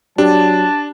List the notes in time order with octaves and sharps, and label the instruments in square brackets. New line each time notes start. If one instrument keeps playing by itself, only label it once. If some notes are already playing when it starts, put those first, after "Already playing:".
[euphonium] F#3 [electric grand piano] D4 [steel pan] G4 [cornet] A5